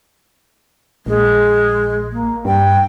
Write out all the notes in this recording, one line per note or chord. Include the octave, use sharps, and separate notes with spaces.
A#1 G#3
A#3
G2 G5